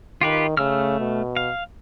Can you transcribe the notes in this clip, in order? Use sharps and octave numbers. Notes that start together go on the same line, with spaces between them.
D#3 F4 G4 B4
C#3 A3 E6 F6
B2
F5